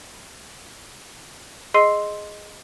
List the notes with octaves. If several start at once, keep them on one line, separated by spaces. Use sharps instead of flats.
G#4 D#5 C6 E6 C7 D#7